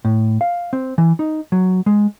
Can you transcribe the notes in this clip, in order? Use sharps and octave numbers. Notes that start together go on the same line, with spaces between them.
A2
F5
C4
E3
D#4
F#3
G#3